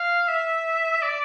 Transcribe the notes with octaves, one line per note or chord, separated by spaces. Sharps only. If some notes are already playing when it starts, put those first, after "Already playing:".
Already playing: F5
E5
D5